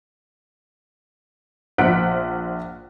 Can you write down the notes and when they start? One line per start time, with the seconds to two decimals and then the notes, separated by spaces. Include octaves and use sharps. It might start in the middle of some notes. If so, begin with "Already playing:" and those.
1.78 A#1 C5 F#5 F#6 B6 D7